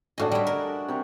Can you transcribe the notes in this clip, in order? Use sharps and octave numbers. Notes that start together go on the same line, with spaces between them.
A2 D4 F#4 G#4 D#5
G3 E4
A#4
C3 A#4 C#6